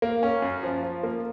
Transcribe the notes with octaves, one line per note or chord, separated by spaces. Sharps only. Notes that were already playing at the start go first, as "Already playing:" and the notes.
A#3
C#4
F#2
F3
F3
A#3